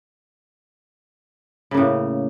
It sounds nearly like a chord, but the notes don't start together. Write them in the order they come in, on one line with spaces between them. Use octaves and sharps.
C#3 A#3 A2